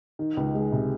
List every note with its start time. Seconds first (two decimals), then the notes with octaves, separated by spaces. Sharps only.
0.19 D#3
0.37 C#2
0.55 G#3
0.72 C3